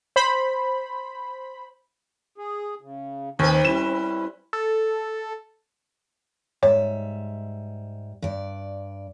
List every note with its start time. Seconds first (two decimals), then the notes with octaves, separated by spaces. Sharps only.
0.16 C5 B5
2.38 G#4
2.81 C#3
3.39 D#2 C4 D#4 B4
3.65 G3 C#4 E4 E7
4.53 A4
6.63 G#2 G3 C#5 E5
8.22 G2 D5